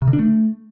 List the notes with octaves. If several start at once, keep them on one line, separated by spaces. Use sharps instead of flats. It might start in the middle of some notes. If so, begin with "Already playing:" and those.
C3
D3
D4
A3